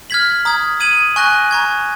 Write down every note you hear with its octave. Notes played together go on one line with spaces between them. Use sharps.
F6 G#6 B6 F#7
A#5 D#6 G#6
D#6 G#6 D#7 F#7
G#5 C#6 F#6 A#6
A#5 C#6 G#6